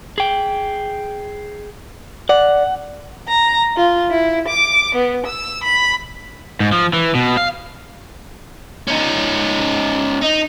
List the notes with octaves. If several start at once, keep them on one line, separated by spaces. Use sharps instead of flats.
G#4 G5
D5 F#5
A#5
F4
E4
D6
B3
E6
B5
G#2
F3
E3
B2
F5
C#4 D#4
D#4